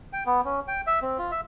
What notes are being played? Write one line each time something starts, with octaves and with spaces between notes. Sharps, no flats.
G5
B3
C#4
G5
E5
C4
F4
E5